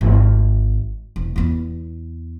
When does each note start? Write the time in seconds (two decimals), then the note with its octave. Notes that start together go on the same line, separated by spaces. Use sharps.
0.01 G#1
1.16 E1
1.36 E2 B3